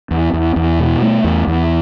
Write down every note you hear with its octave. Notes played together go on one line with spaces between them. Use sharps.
E2
E2
E2
B2
A3
E2
E2